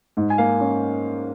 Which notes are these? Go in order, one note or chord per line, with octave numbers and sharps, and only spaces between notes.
G#2
G#5
A#3 F5
C#4